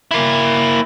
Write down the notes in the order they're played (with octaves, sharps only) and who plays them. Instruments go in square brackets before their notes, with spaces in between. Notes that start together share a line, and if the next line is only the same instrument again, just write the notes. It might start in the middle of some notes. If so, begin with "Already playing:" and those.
[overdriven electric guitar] A#3 E4